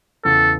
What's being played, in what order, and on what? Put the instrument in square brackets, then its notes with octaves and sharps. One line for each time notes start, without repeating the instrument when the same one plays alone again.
[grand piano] E2 C#3 E3 [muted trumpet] A4